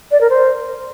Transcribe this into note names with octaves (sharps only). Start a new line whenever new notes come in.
D5
A#4
C5